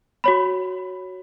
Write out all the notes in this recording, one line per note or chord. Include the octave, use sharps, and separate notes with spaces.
F#4 C#5 B5